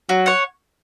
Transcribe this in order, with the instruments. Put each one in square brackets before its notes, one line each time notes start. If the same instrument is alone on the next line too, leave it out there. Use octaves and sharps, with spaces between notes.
[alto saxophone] F#3 [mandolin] F#4
[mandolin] C#5 F#5